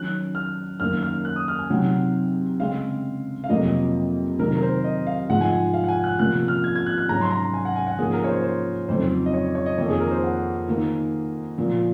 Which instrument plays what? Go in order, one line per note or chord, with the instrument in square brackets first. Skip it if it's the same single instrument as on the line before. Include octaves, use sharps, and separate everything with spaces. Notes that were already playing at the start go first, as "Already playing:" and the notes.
Already playing: [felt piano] D#3 F#3 C#4 [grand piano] F#6
[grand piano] F6
[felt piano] F#2 D#3 A#3 [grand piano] F6
[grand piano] F6
F#6
D#6
F6
G#5
[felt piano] C3 F#3 C4 D#4 [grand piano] F#5
[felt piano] C#3 G#3 C4 [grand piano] F5
[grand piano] F5
[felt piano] F2 C3 F#3 A#3 [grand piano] D#5
[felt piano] C3 D#3 F#3 [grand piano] A#4
[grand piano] A#4
C5
D#5
F5
[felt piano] G#2 F3 G#3 D#4 [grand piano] F#5
[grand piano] G#5
F5
F#5
G#5
F#6
[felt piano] C3 F3 A#3 C#4 [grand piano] F#6
[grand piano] F6
G#6
G#6
F#6
F#6
[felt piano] G#2 F#3 C#4 [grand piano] A#5
[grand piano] C6
A#5
G#5
F#5
G#5
F#5
[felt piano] G#2 F3 A#3 C#4 [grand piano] G#4
[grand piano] A#4
C#5
C5
C5
[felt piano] F2 C#3 F#3 C4 D#4 [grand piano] C5
[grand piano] D#5
C#5
C#5
D#5
[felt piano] F2 D#3 A#3 [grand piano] C#5
[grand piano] G#4
A#4
C5
F#5
[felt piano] D#3 A#3 D#4
A#2 F3 A#3